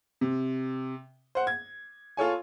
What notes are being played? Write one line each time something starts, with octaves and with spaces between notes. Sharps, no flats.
C3
C5 F#5
G#6
F4 A4 C#5 G#5